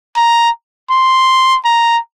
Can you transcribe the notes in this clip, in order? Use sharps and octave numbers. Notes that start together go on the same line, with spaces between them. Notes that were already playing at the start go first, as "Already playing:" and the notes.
A#5
C6
A#5